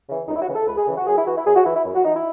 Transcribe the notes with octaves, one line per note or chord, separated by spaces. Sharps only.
C#3 E3
C#2 D#4
E4
F#4
C#3 E3
A4
C#2 B4
G#4
C#3 E3
F#4
F#2 G#4
E4
E3 F#4
E4
F#2 G#4
F#4
E3 E4
E4
F#2
F#4
E3 D#4
E4